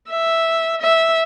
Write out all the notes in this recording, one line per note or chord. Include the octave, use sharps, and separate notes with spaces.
E5
E5